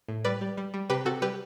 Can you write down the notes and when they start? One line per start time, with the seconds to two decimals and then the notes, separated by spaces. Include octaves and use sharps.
0.08 A2
0.24 G3 B4 D5
0.41 G3
0.57 G3
0.74 G3
0.89 C3 G4 B4
1.05 C3 F#4 A4
1.22 G3 G4 B4